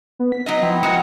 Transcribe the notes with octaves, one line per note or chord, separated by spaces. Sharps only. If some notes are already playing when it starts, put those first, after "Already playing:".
B3
B6
F#3 D#4 D#5
F3 B3 C4 E4
G#3 F#4 A#4 C#7